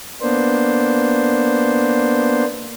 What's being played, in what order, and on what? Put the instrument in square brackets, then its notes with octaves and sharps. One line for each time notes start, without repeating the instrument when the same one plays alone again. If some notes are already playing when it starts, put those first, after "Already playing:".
[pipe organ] A#3 B3 D4 C5